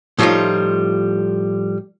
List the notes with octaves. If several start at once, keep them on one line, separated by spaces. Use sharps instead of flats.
A2 F3 G3 A3 D#4 F4